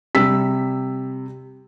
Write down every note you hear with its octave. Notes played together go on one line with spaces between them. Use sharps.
C3 G3 E6 B6